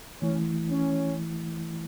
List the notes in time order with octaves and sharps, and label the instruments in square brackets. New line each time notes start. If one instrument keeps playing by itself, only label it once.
[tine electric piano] E3 A3 E4 [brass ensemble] C#4
[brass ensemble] C#4